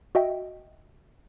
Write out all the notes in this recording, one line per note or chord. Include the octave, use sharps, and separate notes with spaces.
F#4 D#5 E5 G5